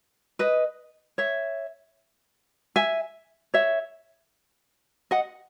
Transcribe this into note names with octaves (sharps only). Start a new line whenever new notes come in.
B4 D#5
C#5 E5
E5 G#5
C#5 E5
D#5 F#5